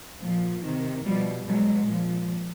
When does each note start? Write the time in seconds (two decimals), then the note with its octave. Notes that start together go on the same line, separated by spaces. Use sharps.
0.23 A#2 F3
0.65 C3 D#3
1.05 B2 F3 G3
1.47 B2 F#3 G#3
1.88 A#2 F3